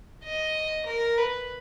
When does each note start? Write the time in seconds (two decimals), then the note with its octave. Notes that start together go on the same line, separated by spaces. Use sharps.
0.24 D#5
0.86 A#4
1.18 B4